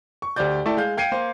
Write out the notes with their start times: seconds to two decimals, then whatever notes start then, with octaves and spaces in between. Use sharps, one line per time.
0.22 C#6
0.36 D2 G4 C5 D5 G6
0.66 A3 E4 D5 G5 A5
0.77 G#3 F5 G6
0.97 F5 G5 G#6 C7 C#7 D#7
1.12 A#3 C5